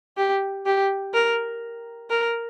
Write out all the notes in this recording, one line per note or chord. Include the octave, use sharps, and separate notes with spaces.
G4
G4
A#4
A#4